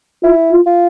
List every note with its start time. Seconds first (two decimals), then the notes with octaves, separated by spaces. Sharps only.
0.23 E4 F4
0.52 F4
0.67 F4